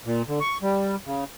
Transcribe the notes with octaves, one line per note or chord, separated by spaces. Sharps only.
A#2
D3
C#6
G3
C#3